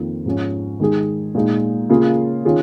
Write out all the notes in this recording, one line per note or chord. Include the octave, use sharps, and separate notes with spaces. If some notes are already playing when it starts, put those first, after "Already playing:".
Already playing: F2 D#3 A#3 F4
G#2 F3 C#4
D#3 G#3 D#4 G#4
A#2 G#3 D#4
C#3 A#3 F4 G#4
D#3 C#4 F4 G#4